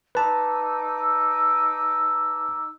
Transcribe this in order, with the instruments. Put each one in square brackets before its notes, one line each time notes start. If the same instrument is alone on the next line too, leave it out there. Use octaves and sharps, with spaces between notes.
[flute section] D#4 D6 E6 [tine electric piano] B4 A5